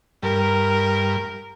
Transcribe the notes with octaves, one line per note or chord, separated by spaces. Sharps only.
G2 A#4